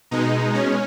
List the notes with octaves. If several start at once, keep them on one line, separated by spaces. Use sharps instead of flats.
B2 G#3 D#4
C#4